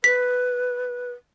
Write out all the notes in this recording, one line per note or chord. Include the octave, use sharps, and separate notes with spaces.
B4 B6